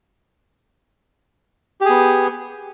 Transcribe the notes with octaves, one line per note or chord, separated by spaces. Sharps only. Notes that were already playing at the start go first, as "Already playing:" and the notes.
B3 G4 G#4